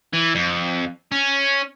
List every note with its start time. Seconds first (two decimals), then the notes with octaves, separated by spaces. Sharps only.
0.13 E3
0.35 F2
1.12 C#4